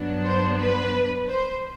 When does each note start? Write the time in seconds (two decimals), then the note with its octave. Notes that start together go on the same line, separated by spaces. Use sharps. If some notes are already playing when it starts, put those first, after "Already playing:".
Already playing: G2 F#3 B3 D4
0.24 C5
0.58 B4
1.28 C5